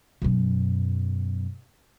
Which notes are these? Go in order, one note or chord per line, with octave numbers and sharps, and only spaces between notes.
F#2 B2